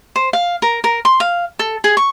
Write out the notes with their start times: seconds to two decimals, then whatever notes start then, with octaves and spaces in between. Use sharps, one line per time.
0.16 C5
0.33 F5
0.62 A#4
0.84 A#4
1.05 C6
1.20 F5
1.59 A4
1.84 G#4
1.97 C#6